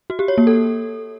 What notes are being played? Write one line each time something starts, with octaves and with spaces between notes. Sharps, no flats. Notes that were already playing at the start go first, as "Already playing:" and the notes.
F#4
G4
C#5
A#3
A4